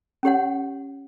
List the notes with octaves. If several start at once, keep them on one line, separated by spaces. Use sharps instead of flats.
C#4 G4 C#5 F#5